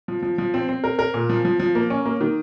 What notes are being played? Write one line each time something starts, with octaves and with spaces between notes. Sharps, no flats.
F3
F3
F3
C4
C4
A#4
A#4
A#2
F3
F3
F3
A#3
C#4
A#3
D#3